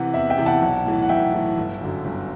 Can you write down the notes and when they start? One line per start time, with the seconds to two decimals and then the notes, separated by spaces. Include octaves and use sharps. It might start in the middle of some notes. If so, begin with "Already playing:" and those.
Already playing: C3 E3 F#5
0.14 E2 E5
0.30 E5 G5
0.38 C3 E3
0.46 F#5 A5
0.62 B1
0.86 A2 E3
1.02 F#5
1.09 B1 E5 G5
1.33 A2 E3
1.58 G1
1.81 F#2 D3 F#3
2.05 G1